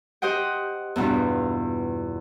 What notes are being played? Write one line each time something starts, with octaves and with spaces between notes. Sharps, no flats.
G4 C5 D#5 F#5 G5
E2 G2 B2 F4